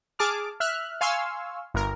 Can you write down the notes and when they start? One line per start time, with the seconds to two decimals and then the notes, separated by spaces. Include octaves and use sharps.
0.19 G#4 A5 D6 F6
0.60 E5 F6 F#6
1.01 F5 G#5 C6 C#6 E6 F6
1.74 G1 A#4